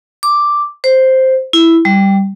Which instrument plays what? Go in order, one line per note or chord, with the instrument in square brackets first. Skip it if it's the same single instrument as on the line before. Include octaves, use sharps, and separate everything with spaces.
[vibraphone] D6
C5
E4
G3